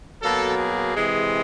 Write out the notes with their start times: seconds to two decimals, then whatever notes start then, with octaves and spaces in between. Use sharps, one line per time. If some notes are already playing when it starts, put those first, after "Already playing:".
0.22 B2 F#3 A#3 A4
0.58 G#4
0.95 C3 E3 G#3